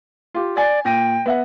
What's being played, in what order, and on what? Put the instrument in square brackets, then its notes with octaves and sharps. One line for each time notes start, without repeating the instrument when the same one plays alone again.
[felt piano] F4 G4
[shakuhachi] D5 [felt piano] G#5 A6
[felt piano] A#2 A#6 D#7 [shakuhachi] G5
[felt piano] B3 E5 F#5